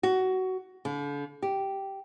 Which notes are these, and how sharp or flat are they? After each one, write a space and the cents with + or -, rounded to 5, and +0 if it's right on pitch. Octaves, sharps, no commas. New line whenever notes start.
F#4 +15
D3 -40
G4 -10